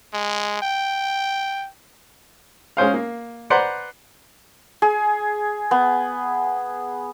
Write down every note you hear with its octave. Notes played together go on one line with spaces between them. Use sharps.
G#3
G5
G#3 C#4 C5 F5
A#3
B4 C5 D5 F#5 A#5 C6
G#4
B3